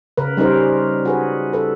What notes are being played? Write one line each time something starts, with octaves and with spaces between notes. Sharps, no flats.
C#3 A#4 B4
G3 C#4 D#4 A#4 C5
F#4 G#4 B4
A4 B4